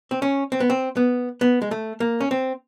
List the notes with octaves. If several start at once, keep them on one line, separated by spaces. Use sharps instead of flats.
C4
C#4
C4
B3
C4
B3
B3
G#3
A3
A#3
C#4
C4